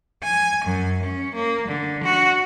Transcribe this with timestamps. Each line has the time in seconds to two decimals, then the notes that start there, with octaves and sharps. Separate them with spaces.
0.23 G#5
0.64 F#2
1.02 C#4
1.34 A#3
1.68 D3
2.04 F#4